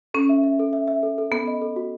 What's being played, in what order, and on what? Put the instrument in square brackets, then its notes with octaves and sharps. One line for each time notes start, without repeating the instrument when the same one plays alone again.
[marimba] C#4 [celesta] A4
[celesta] E5
E5
A4
E5
E5
A4
A4
[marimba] B3 [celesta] A4
[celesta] D#5
A4
F#4